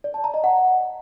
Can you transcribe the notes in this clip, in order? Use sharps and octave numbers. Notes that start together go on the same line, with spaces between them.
D5
A5
A#5
D#5
F#5